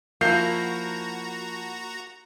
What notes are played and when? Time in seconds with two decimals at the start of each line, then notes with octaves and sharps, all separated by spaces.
0.21 F3 A#3 E4 F#4 A#5 G6 C7